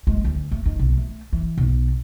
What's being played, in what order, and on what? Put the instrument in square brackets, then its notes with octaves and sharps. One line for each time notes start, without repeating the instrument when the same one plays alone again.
[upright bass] G#3
D2
A3
D#3
B1
A3
E3
B1